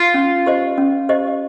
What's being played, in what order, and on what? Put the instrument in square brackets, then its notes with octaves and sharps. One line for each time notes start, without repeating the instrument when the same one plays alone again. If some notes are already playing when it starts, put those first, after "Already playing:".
Already playing: [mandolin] F4
[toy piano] C#4
G4 C5 D#5
C#4
G4 C5 D#5